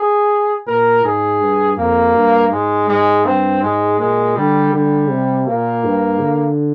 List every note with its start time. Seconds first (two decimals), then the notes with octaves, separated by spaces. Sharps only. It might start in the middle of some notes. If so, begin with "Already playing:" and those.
Already playing: G#4
0.67 A#2 A#4
1.03 G#2 G#4
1.40 G2
1.78 F2 A#3
2.15 G2
2.52 G#2 G#3
2.88 G#2 G#3
3.25 G2 C4
3.62 G#2 G#3
3.99 A#2 G#3
4.36 D3 G3
4.73 D3 G3
5.09 C3
5.46 A#2 A#3
5.84 G2
6.20 D3